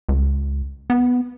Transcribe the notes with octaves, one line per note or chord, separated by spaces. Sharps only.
C#2
B3